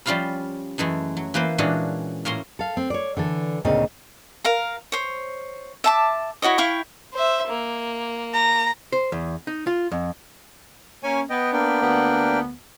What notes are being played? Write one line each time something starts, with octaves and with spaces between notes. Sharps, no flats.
F3 G3 C#4 F4 F5 B5
F#2 E3 G#3 A3
F#3
E3 A#3 B4 C5
A#2 E3 G#3 C#4 D4 F#4
A2 A#3 C#4 A#5 C6
A4 F5
C4
C#5 D5
D3 E3 A4
D2 A#2 C#3 C4 D#4 D#5
A#4 F5 A#5
C5 C#5
E5 A5 D6
E4 F#4 C#5 D#5
E4 F5 G5 C#6
C5 E5
A#3
A#5
C5
E2
D#4
F4
F2
A#3 C#4 C#5 G#5
B3 D#5 G5
A#3 D4 G5
D2 B3